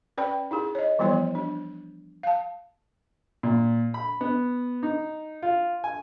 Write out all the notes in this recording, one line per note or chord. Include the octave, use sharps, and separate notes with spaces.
C#4 B4 D5 G5 B5
D#4 E4 G#4
C#5 D#5
E3 F3 G3 B3 E4 C#5
D4
F5 A5
A#2
B5
B3
D#4
F4
G#5